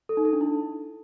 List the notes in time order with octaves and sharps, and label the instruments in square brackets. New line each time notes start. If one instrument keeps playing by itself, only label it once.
[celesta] A4
D#4
A4
D4
E4